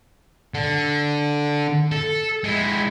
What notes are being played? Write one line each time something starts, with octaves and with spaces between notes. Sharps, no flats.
D3
A4
G#3 E4